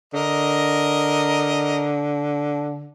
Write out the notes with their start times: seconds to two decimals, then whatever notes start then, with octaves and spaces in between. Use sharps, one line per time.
0.14 D3 A#4 D#5